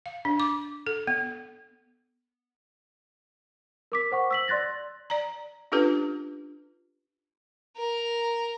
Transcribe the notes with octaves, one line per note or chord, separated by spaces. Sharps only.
F5
D4
D6
A4
B3
A#4 D6 B6
C5 F#5 C#6
E6 B6 F#7
D5 C6 F#6 A6 A#6
D5 A#5
C#4 D4 F4 G4 A4 B4
A#4